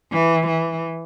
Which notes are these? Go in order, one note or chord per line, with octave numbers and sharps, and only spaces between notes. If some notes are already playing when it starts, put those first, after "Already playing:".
E3
E3